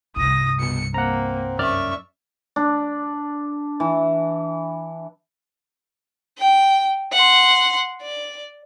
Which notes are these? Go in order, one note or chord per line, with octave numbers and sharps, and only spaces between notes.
C2 G2 D#6 A#6
B2 C#7
A#3 C4 F#5 A#5
F#2 D5 E5 C#6 F6
D4
E3
G5
F#5 C6
D5